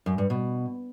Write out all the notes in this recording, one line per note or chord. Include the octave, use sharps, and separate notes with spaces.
F#2
G2
B2